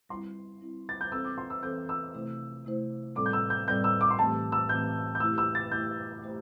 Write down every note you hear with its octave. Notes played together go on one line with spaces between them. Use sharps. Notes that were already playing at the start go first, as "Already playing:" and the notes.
G3 C4 E4 C6
G3 C4 E4
A6
G6
E3 C4 A4 C5 E6
D6
C6
E6
E3 C4 A4 C5 G6
E6
C3 A3 E4 C5
C3 A3 E4 C5
A2 G3 C4 A4 D5 D6
G6
E6
G6
A2 G3 C4 A4 D5 G6
E6
D6
C6
A2 E3 A3 C4 G4 A5
E6
A2 E3 A3 C4 G4 G6
G6
A3 E4 G4 E6
E6
A6
A3 E4 G4 G6
A3 E4 G4 C5